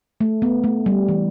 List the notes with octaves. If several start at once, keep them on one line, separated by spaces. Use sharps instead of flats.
A3
B3
A3
G3
E3